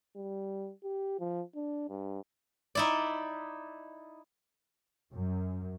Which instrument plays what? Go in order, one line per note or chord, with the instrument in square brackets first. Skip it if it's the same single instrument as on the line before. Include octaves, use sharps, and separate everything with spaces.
[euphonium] G3
G4
F3
D4
G2
[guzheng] D#4 E4 D5
[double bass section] F#2